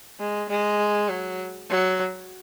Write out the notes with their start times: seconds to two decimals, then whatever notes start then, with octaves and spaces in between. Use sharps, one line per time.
0.19 G#3
0.49 G#3
1.09 F#3
1.69 F#3